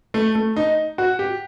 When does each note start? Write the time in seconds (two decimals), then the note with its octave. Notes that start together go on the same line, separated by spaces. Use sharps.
0.14 A3
0.35 A3
0.56 D#4
0.98 F#4
1.19 G4